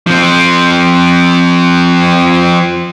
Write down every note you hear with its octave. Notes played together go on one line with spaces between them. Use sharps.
F3 C4